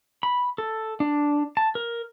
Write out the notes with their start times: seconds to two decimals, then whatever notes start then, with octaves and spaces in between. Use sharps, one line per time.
0.23 B5
0.58 A4
1.00 D4
1.57 A5
1.75 A#4